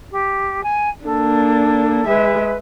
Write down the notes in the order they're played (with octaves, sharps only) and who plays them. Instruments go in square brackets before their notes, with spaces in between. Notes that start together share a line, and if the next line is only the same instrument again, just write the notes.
[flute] G4
G#5
[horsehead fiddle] A#3 D4 [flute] A4
[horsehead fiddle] G#3 E5 [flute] B4